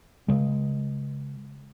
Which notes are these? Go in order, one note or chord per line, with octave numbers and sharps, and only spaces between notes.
C#3 G#3